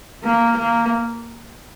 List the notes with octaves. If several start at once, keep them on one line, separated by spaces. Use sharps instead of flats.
A#3
A#3